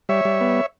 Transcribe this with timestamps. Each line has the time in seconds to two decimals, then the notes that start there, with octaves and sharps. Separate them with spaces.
0.09 G3 C#5 E5
0.25 G3
0.41 B3